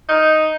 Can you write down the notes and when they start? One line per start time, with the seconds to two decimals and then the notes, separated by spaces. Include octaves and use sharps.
0.09 D#4